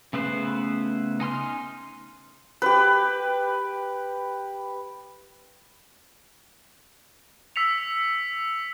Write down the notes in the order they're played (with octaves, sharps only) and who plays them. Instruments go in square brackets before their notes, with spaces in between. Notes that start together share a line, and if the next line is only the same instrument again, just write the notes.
[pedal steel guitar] C#3 A3 B3 B4 C5
D#4 G#5 C6 F6
[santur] G4 B4
[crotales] E6 B6 C#7 F7